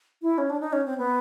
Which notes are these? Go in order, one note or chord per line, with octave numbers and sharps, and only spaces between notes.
E4
C#4
D4
D#4
C#4
C4
B3